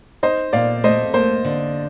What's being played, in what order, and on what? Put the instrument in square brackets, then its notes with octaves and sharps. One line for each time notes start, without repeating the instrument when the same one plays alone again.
[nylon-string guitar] D#4 [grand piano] C5 D#5
[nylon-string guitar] A#2 [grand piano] D5 F5
[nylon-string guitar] A3 [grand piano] C5 D#5
[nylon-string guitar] A#3 [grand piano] C5
[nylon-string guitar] D3